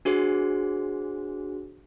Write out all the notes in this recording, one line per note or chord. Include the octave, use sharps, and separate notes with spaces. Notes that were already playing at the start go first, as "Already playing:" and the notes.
D4 F#4 G#4 C5